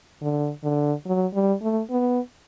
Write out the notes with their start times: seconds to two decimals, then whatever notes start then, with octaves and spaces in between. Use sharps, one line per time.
0.21 D3
0.63 D3
1.06 F#3
1.34 G3
1.62 A3
1.90 B3